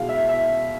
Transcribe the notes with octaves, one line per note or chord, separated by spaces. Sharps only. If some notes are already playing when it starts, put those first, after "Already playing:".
Already playing: B2 G#3 F5
E5
E5